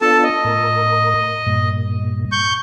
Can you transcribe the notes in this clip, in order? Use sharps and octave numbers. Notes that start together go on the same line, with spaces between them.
B3 D4 F4 A4 A5
D#5
A2 A#4
G2 A#2
C#6 G6